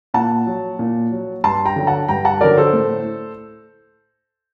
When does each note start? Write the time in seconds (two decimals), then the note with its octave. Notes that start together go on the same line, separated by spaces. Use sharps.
0.14 A#2 F#5 A5
0.46 F#3
0.79 A#2
1.12 F#3
1.44 G2 A5 C6
1.65 G5 A#5
1.76 D3 F#3
1.87 F#5 A5
2.08 G2 G5 A#5
2.25 F#5 A5
2.41 D3 F#3 A#4 D5
2.57 A4 C5
2.73 A2